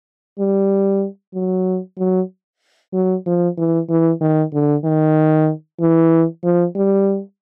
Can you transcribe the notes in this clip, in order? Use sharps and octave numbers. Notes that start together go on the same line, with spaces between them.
G3
F#3
F#3
F#3
F3
E3
E3
D#3
D3
D#3
E3
F3
G3